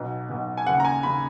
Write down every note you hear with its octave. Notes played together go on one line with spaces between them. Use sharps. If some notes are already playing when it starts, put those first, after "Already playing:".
Already playing: B1 B2
B1 B2
G#5
D#2 C#3 F#5
A#5
G#5
D#2 C#3 B5